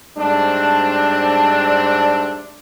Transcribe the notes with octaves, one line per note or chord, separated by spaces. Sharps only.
G#2 G3 A3 C4 D4